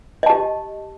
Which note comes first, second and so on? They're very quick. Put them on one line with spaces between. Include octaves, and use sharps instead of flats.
D#5 A5 G4